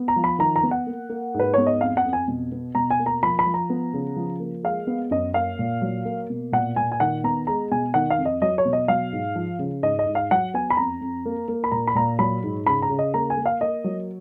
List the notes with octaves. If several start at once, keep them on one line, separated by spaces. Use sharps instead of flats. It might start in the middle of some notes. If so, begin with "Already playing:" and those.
Already playing: B3
A#5
F3
B5
D#3 A#5
A#5
B3
F#5
A#3
A#3
G#2
B4
B3 C#5
D#5
F2 F5
F#5
F2
G#5
B2
B3
B2 A#5
G#5
A#3
A#5
F3 B5
B5
F3
A#5
B3
C#3
F3
A#3
G#3 F5
B3
F#2 D#5
A#3 F5
A#2
F#3
A#3
B2
A#2 F#5
A#2 G#5
G#5
D#3 F#5
B3 A#5
G#3 A#5
B2 G#5
D#3 F#5
F5
F2
D#5
F#3 D#5
C#5
B2
D#5
F#3 F5
G#2
F3
C#3
G#2 D#5
D#5
G#2
F5
F#3 F#5
B3 G#5
B5
F2 A#5
F2
A#3
A#3
B5
A#2 A#5
B5
A#2 A#5
F#3 B5
G#2
C#3 B5
A#5
C#3
D#5
A#3 A#5
G#5
A#3
F5
A#3 D#5
F#3